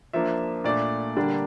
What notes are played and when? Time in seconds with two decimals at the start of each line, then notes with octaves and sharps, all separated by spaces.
0.13 F3 A#3 D4 E5
0.64 A#2 A3 D4 D5
1.16 D3 G3 A#3 D4